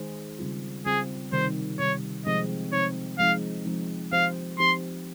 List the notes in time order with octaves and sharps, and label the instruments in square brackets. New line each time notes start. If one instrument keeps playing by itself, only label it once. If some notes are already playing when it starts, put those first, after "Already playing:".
Already playing: [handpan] D#3 G#3 D#4 G#4 C5
C#3 G3 C4 F4
[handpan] C#3 G3 C4 F4 [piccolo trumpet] G#4
[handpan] C3 D#3 G3 [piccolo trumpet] C5
[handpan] C3 D#3 G3 [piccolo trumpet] C#5
[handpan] C3 F3 G#3 C4 D#4 [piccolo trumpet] D#5
[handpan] C3 F3 G#3 C4 D#4 [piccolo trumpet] C#5
[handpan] F3 G#3 C4 D#4 [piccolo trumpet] F5
[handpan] F3 G#3 C4 D#4
[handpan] F3 C4 D#4 G4 C5 [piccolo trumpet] F5
[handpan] F3 C4 D#4 G4 C5 [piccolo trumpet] C6